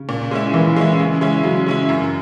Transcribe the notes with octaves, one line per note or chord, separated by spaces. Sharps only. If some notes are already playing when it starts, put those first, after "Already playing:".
Already playing: C#3
A#2
G#3 C#4 E4
A#2 E3
G#3 C#4 E4
C#3
G#3 C#4 E4
C#3 F#3
G#3 C#4 E4
F#2